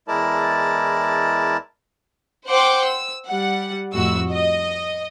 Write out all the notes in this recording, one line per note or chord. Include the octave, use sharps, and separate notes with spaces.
E2 G#3 E4 A#4 D5 A5
C5 F#5 G5 C6 D6
E6
G3 F#5
F2 A2 F#4 E6
D#5